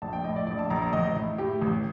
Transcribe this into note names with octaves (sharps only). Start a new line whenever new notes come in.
A#1 A5
G5
A2 D#5
D5
A#1 D5
A5
A#1 A#5
A#5
A1 D#5
A2
A2 G4
A1